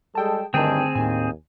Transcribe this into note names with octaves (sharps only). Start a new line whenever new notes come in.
G3 G#3 G#4 A4 G5 A5
G2 D3 D#3 A3 C4 G#4 G5 A5
D#2 A2 D4 G#5